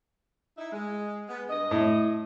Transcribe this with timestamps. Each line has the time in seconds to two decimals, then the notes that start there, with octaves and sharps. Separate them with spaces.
0.58 D#4 E4
0.73 G#3
1.28 G#3 B3
1.50 G2 D#5
1.71 A2